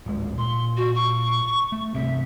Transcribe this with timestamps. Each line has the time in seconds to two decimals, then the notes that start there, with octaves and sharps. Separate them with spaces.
0.06 D1 G#1 G#3
0.38 A#2 C6
0.77 F#4
0.95 C#6
1.72 A3
1.95 G1 C2 C3 E5